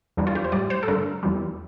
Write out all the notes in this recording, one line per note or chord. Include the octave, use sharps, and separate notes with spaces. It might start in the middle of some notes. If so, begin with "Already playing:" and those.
E2 E3 G3 D4
F4
G4
C5
A2 G3 D5
C5
A4
G2 D3 A3 A#4
E2 E3 G3